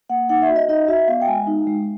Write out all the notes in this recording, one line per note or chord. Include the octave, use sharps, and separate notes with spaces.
A#3 F#5
D#4 F#5
E5
F#4
D#5
D#4 D#5
F#4 E5
B3 F5
G5
G#3 G#5
D#4
G#3